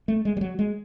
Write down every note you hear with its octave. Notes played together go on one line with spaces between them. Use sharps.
A3
G#3
G3
F#3
G#3